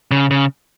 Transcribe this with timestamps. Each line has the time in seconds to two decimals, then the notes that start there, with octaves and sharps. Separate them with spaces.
0.11 C#3
0.31 C#3